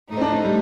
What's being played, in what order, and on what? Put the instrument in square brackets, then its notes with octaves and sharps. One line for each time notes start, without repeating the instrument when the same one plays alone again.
[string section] A2 A3 D#4
[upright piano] C4
D4
D4
G3